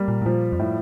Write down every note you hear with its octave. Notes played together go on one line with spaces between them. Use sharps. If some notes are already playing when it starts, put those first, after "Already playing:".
Already playing: G3 A#3
A#2
A2
A#2 F3
F2
A2